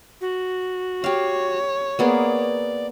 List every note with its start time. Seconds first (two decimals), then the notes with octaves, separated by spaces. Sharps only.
0.21 F#4
1.04 G4 C#5 F5
1.99 A#3 B3 G#4 D5